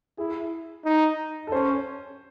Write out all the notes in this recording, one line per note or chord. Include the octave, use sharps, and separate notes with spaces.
E4 G#4
D#4
A4
C#4 C5